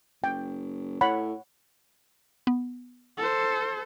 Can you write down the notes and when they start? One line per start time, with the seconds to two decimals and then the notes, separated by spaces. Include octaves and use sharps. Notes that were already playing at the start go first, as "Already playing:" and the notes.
0.24 F#1 G5
1.01 A2 C#5 F#5 B5
2.47 B3
3.18 A4 C5